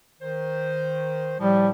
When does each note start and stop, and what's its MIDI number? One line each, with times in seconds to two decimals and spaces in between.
0.21 1.36 51
0.21 1.36 72
1.40 1.72 45
1.40 1.72 53
1.40 1.68 55